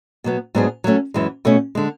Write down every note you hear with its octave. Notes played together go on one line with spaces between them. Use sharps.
B2 F#3 B3
G#2 F#3 B3 D4 G#4
F#3 A3 C#4
F#2 E3 G#3
B2 A3 C#4
D3 G#3